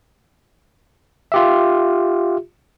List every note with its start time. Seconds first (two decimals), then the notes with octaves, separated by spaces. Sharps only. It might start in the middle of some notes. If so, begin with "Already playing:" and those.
1.32 F4 G4 E5